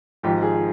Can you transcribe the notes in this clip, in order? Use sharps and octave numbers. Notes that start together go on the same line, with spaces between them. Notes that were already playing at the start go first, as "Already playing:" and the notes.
G#1 G#2 F3 G4
G#4